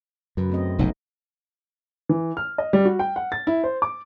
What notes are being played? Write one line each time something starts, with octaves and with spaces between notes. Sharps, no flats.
F#2 C#3 F#3 B4
A3 C4 D#5
F1 B1 G#2 A3 D#4
E3
F6
D#5
G3
F#4
G5
F#5
A6
E4
C5
D6